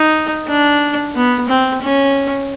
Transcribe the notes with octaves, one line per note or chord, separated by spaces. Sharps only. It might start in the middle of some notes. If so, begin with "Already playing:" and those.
Already playing: D#4
D4
B3
C4
C#4